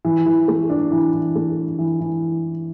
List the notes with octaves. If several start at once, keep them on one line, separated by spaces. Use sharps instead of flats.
E3
E3
A3
D4
E3
E3
A3
D4
E3
E3